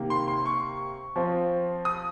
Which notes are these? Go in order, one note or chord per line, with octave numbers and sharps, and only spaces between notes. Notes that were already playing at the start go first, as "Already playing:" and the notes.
Already playing: C3 D#3 A#3
C6
C6
C#6
F3 C4 F4
D#6